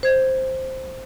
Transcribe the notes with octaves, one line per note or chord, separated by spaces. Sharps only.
C5 G#6